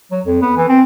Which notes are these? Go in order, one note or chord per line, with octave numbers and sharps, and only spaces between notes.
F#3
F2
B3
E3
C4